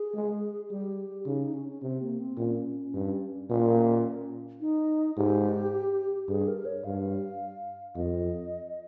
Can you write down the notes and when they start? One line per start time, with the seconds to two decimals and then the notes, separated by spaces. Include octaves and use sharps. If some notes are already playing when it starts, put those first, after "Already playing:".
Already playing: G#4
0.14 G#3
0.70 G3 G4
1.26 C#3 D#4
1.41 D#4
1.54 C#4
1.68 C#4
1.82 C3 C4
2.01 A#3
2.20 C4
2.37 A#2 C#4
2.94 G2
3.50 A#2
4.61 D#4
5.17 G#2 G4
6.28 G2 G#4
6.48 A#4
6.65 C#5
6.84 G2 F5
7.96 F2 D#5